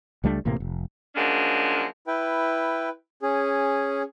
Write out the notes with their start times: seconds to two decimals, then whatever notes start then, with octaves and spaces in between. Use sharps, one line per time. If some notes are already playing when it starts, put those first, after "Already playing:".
0.24 C#2 G3 A3 D4
0.45 A1 A2 C3 A#3
0.60 F1
1.16 F3 F#3 G#3 A#3 C#4 D4
2.07 E4 B4 G5
3.22 C#4 G#4